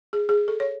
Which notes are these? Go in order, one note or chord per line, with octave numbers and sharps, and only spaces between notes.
G#4
G#4
A4
C#5